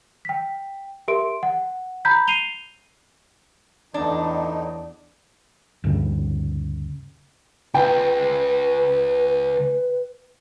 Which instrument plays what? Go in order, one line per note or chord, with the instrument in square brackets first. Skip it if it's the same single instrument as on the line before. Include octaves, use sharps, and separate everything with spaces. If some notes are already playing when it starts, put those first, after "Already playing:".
[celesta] G5 B6
G4 A#4 E5 C6 D7
F#5
A#5 B5 G6 B6
C7 D#7 F7 G7
[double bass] E2 [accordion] A2 D#4 [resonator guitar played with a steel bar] D4 [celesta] D5 A5
[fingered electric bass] D2 G2 C#3
[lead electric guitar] C#2 [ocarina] B4 [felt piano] G5